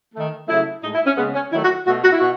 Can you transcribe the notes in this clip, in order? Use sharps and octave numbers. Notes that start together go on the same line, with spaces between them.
D#3 A3
C#3 F#3 A3 E4
A2 G#3 D#4
E4
C#4
C#3 G#3 B3
C#4
D#3 F#3 A3 E4
F#4
B2 A3 F#4
F#4
E4
B2 F#4